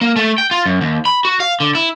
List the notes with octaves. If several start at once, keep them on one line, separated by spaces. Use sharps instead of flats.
A#3
A3
G5
F4
F#2
D#2
B5
F#4
F5
D3
E4